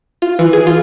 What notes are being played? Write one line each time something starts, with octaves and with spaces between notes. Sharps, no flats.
F4
E3
G#4
F4